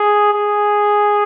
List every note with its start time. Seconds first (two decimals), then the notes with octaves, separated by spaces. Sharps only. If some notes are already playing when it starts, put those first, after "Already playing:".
Already playing: G#4
0.34 G#4